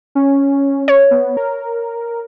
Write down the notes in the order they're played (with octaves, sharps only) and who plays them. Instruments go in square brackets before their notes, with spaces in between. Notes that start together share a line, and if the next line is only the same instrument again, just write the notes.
[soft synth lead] C#4
[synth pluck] C#5
[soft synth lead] B3
A#4